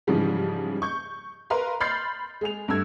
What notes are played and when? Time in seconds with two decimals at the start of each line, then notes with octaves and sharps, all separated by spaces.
0.07 G#2 C#3 E3 F3 G3 G#3
0.82 C#6 G6
1.50 A#4 B4 F5 A#5 C6
1.80 B5 C6 F6 G6 A6 C7
2.41 G#3 G#4 F7
2.68 G2 A3 E6 G#6